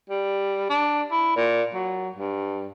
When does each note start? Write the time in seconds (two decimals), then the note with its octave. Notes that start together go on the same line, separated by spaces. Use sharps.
0.10 G3
0.70 D4
1.12 E4
1.36 A#2
1.74 F#3
2.16 G2